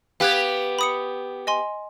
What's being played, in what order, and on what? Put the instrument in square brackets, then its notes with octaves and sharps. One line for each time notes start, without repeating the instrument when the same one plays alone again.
[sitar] B3 G4 [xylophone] F5 F#6 G#6
[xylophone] B5 D#6 C#7
D#5 G#5 C6